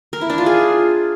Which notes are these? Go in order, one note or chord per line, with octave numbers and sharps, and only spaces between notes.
A#4
E4
D4
F4
G#4